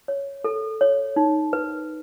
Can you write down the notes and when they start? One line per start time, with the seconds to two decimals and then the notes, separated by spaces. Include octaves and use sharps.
0.08 C#5
0.44 A4
0.81 C#5
1.16 D#4
1.53 B4